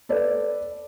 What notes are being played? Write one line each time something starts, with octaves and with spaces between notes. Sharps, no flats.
A4 B4 D5